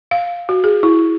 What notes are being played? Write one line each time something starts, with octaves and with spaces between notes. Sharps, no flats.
F5
F#4
G#4
E4